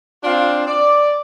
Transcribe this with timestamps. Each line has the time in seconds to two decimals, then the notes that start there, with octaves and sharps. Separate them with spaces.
0.24 C4 D4 F4
0.67 D5